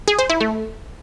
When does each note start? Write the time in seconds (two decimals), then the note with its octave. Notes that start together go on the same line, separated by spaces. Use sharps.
0.08 G#4
0.19 C5
0.30 E4
0.41 A3